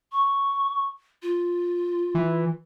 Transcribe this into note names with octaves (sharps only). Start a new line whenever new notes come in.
C#6
F4
E3